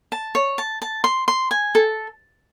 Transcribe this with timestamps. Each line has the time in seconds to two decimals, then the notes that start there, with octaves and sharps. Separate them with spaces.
0.12 A5
0.35 C#5
0.58 A5
0.82 A5
1.04 C6
1.28 C6
1.51 G#5
1.75 A4